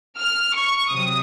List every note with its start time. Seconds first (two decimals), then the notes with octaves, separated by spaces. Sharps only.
0.18 F6
0.55 C#6
0.91 C3 F#3 D#6